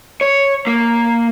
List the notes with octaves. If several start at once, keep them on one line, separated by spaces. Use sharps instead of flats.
C#5
A#3